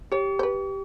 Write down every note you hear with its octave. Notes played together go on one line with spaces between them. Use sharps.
G4 C#5
C5
B4